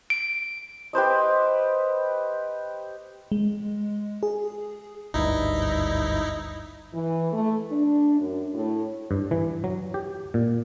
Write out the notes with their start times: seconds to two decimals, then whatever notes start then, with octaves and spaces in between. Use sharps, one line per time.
0.10 D7
0.93 G4 B4 C5 D#5
3.32 G#3
4.23 G#4
5.14 G#1 D2 G2 D#4 E4
6.94 E3
7.33 A3
7.71 D4
8.19 F#2
8.53 A2
9.11 G2
9.31 E3
9.64 F#3
9.94 G4
10.34 A#2